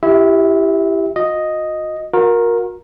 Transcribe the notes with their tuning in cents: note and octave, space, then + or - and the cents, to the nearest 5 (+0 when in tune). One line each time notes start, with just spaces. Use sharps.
E4 +20 G4 +0 E5 -25
F#4 -45 D#5 +0
F#4 -40 A#4 +5